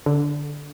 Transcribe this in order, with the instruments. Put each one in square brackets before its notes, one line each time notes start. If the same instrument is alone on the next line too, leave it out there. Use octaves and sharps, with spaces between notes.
[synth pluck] D3